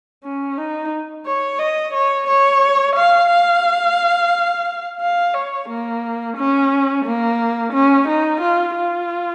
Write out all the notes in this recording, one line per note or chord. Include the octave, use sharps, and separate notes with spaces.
C#4
D#4
C#5
D#5
C#5
C#5
F5
F5
F5
C#5
A#3
C#4
A#3
C#4
D#4
F4
F4